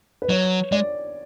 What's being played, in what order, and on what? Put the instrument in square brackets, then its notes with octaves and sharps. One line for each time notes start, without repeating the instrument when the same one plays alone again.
[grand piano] B4
[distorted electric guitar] F#3 [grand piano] C#5
[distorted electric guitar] G#3 [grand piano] D5